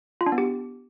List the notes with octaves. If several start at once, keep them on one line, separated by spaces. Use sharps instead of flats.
F4
D4
B3
G4